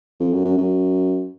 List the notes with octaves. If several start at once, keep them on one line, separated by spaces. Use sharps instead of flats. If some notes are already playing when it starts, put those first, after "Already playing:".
F2
F#2
F#2
F#2